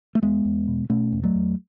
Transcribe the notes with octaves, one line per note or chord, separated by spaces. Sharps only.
A3
E2 G#3 B3
E2
B2
B2 A3 C#4
E2
F#3 A3
E2